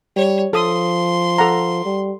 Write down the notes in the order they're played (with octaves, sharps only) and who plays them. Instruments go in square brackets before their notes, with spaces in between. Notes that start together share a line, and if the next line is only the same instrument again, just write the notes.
[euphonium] G3 [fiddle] C#5
[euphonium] F3 [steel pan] A4 D#6 [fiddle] C6
[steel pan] A4 F#5 A#5
[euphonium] G3